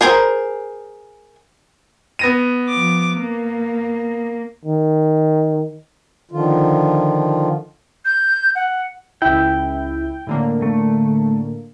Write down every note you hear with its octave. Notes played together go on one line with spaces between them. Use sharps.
G#4 A#4 C5 G#5
B3 A#6 D#7
F3 D6
A#3
D#3
D3 D#3 F3 F4
G6
F#5
C#2 E4 G5
A2 D3 A#3
A3